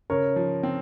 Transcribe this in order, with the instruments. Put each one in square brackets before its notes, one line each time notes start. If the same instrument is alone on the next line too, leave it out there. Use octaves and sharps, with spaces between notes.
[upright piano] C#3 [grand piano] A#4 C#5
[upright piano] F3
C4